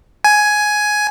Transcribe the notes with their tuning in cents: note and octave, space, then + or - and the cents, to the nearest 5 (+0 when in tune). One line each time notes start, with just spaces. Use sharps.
G#5 +10